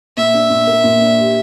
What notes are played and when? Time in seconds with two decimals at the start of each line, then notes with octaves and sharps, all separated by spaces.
0.17 A#2 E5
0.34 D4
0.50 A#2
0.67 A#3
0.84 A#2
1.00 D4
1.18 G4